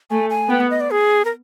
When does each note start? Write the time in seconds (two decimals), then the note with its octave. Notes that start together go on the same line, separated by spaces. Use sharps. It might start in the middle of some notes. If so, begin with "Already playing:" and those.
0.10 A3 G#5
0.30 G#5
0.50 B3 G5
0.60 F#5
0.70 D#5
0.80 D5
0.91 G#4
1.25 A#4